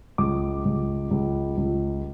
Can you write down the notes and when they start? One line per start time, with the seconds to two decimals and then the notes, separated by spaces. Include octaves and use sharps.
0.18 C#2 D6
0.65 C#2
1.11 C#2
1.57 C#2